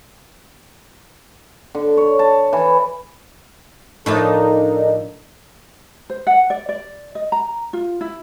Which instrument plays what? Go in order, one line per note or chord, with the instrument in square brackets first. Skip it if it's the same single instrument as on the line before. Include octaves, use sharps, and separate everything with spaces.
[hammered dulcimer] D3
C#5
A5
E3
[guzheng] A2 F3 A5 [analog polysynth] D4 D#4 [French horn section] A4 A#4
[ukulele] C5
F#5
D5
D5
D#5
A#5
F4
E4